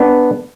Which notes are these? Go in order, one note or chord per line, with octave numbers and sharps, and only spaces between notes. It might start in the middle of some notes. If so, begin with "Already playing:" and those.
Already playing: B3 D4